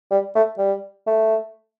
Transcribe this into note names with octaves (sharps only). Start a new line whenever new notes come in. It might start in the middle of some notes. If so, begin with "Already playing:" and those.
G3
A3
G3
A3